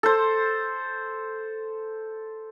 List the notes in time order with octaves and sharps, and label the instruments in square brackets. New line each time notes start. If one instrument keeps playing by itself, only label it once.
[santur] A4 C5